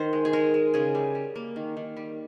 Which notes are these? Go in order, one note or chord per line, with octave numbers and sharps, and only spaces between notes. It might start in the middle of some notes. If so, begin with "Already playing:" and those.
Already playing: D#3 C5
G#3
G#4
G#3 A#4
G#3
C#3 G#4
G3
G3
A#3
D#3
D#3
G3